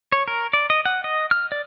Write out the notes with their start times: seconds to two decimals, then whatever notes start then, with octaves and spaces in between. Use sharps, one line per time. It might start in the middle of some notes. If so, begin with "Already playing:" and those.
0.12 C#5
0.28 A#4
0.53 D5
0.70 D#5
0.85 F#5
1.04 D#5
1.31 F6
1.52 D5